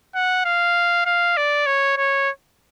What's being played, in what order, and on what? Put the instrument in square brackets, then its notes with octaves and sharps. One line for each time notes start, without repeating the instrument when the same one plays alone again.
[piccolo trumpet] F#5
F5
F5
D5
C#5
C#5